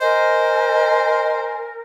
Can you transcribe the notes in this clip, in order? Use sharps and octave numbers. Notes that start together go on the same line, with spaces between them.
A#4 C5 D#5 G#5